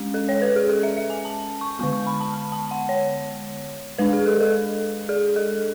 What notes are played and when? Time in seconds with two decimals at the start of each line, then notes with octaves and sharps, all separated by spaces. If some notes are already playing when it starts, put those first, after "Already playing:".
Already playing: G#3 C#4
0.14 A4
0.29 C#5
0.42 B4
0.56 G#4
0.69 A4
0.83 E5
0.97 E5
1.10 G#5
1.25 A5
1.61 C#6
1.79 D3 G#3 B3 C#6
1.93 C#6
2.07 B5
2.20 A5
2.34 B5
2.52 A5
2.71 F#5
2.89 C#5
3.98 G#3 D4 B4
4.13 G#4
4.26 A4
4.40 A4
5.09 G#4
5.36 A4